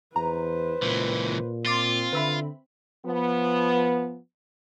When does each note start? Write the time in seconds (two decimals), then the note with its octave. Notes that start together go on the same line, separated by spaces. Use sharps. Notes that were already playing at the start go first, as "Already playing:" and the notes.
0.16 E2 B4 C5 A#5
0.83 C#2 A#2 E3
1.66 C4 F4 C6 D6 A6
2.13 D3 B4 E5 B5
3.06 F3 B3